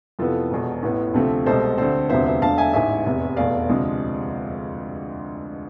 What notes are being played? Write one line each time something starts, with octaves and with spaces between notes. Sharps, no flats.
F2 C3 E3 B3 F4 A4
E1 E2 B2
A1 A2 E3 B3
D2 C3 F3 A3 C4
C2 B2 G#3 A4 C5
D2 D3 A3 C4 A4 C5
E1 D2 C3 F3 B3 C5 E5
C5 E5
E1 D2 D3 A3 F5 A5
E5 G#5
A1 G#2 E3 E5 G#5
F1 E2 C3
F1 E2 B2 A3 D5 F5
D2 C3 F3 G#3